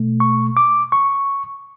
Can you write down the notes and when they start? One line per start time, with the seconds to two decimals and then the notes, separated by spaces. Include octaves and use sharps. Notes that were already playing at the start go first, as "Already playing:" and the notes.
Already playing: B2 A3
0.20 C#6
0.57 D6
0.92 C#6